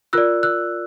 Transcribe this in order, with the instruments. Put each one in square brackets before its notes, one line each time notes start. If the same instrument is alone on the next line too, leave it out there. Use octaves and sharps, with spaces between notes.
[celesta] F4 A#4 D5 E6 F#6
E6 F#6